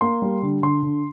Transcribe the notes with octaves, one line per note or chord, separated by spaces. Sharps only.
A#3 C6
G3
D3
D3 C6
D3